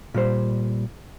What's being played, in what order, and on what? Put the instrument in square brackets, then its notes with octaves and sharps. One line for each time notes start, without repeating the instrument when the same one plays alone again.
[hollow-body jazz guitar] A#2 G3 C5